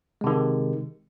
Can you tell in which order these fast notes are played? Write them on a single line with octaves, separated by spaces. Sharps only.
G#3 C3 D#3